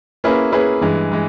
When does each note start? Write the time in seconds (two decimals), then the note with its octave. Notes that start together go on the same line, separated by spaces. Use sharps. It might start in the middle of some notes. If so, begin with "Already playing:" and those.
0.24 A#3 C#4 E4 G#4 B4
0.52 A#3 C#4 E4 G#4 B4
0.81 G2 E3 G#3
1.12 E3 G#3